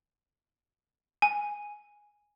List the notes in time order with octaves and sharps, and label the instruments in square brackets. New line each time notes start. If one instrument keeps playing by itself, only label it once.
[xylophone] G#5